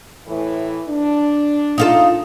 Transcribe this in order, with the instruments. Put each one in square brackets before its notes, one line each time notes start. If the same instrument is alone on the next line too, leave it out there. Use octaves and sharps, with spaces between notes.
[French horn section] A2 E3
D4
[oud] D#4 F4 A4